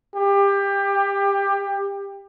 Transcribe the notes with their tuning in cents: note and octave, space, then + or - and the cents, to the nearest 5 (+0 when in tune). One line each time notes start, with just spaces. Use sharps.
G4 +20